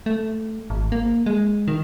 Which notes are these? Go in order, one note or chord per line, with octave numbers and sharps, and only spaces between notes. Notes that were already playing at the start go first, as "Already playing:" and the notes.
A3
G#1
A#3
G#3
D#3